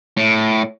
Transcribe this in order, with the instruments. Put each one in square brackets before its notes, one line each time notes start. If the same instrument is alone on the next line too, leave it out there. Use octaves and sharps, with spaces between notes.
[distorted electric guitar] A2